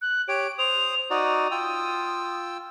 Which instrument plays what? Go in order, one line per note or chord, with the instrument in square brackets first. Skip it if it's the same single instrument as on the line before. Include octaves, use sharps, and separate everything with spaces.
[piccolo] F#6
[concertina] G4 C#5 [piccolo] D7
[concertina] C5 D#6 [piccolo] F7
[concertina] D#4 F#4 D5 [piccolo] D#6
[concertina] F4 G5 E6